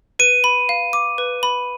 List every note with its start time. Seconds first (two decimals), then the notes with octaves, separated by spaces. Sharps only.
0.19 B4 D#7
0.44 B5
0.69 F5
0.93 D6
1.18 B4
1.43 B5